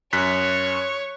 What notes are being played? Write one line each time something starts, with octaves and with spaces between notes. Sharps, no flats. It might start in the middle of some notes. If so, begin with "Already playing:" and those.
F#2 C#5 F#6 B6